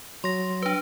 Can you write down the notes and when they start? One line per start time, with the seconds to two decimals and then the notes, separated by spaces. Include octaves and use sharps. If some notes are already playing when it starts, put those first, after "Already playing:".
0.24 F#3 C6 A#6
0.62 D4 B4